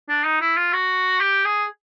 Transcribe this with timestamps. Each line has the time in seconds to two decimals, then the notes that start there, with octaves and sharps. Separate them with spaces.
0.09 D4
0.25 D#4
0.41 E4
0.57 F4
0.73 F#4
1.20 G4
1.45 G#4